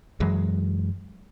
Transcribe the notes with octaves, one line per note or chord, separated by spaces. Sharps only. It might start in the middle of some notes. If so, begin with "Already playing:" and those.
F#2 E3 F#3 G#3